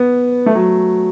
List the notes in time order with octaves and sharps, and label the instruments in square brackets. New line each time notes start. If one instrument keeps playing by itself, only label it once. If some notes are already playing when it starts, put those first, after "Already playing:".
Already playing: [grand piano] B3
A3
F#3